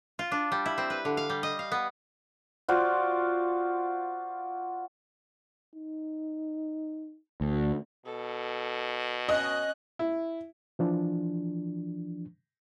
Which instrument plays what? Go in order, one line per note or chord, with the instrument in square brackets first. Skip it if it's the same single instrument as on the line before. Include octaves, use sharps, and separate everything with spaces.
[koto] F4
D4
G3
E4
C4
B4
D3
F5
G3
D#5
F5
B3
[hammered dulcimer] F4 F#4 C5 D5
[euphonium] D#4
[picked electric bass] D2
[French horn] B2 [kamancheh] A4
[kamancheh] C#4 F#6 [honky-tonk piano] D#5
[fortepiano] E4
[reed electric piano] E3 F3 D4